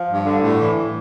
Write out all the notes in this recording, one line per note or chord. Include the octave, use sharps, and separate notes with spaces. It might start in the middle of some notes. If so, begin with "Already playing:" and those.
Already playing: F3
G2
D3
A2
E3